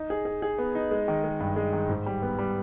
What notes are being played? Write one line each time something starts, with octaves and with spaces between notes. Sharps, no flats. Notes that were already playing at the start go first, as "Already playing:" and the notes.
Already playing: D#4
G#4
G#4
G#4
B3
D#4
G#3
D#3
G#3
G2
G#3
D#3
G#2
G3
B3
G3